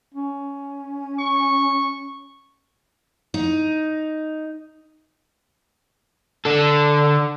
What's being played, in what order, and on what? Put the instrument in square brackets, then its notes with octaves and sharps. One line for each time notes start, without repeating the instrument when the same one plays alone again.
[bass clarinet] C#4
[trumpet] C#6
[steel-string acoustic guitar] D#4
[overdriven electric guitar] D3 A4